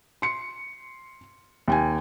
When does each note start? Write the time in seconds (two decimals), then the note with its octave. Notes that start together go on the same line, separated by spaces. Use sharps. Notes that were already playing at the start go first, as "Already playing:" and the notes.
0.22 C6 C#7
1.68 D#2 G5 G#5